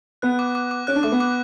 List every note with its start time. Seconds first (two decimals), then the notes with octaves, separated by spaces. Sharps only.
0.22 B3 F#6
0.39 D6
0.55 D6
0.71 D6
0.87 C#4 F#6
0.96 D4
1.03 A3 D6
1.12 B3
1.20 D6